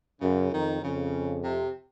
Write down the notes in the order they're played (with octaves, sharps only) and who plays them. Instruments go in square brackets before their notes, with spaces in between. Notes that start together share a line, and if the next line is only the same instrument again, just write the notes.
[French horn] F#2 [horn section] C#3
[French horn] F2 [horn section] D#3
[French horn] F2 [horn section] C#3
[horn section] C3